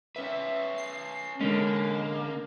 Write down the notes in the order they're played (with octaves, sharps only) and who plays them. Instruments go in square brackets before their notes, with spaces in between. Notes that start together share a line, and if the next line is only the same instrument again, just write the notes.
[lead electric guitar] C#4 B4 [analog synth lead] E5
[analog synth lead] C7
[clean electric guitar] D3 C#4 [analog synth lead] G#3 [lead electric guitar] A#3